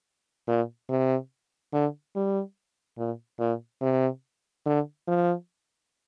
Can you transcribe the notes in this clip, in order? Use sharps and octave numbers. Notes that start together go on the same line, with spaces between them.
A#2
C3
D3
G3
A#2
A#2
C3
D3
F3